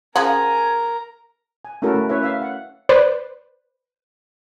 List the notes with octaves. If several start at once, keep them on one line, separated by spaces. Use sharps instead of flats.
C#3 F3 A#4 F#5 G#5 A#5
G#5
A3 C#4 E4 F#4 A4 A#4
A3
C#4 E4 B4 C#5 E5
E5 F5
F#5
B4 C5 D5